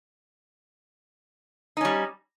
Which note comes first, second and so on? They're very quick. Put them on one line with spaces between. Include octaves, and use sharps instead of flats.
D#4 C#4 G3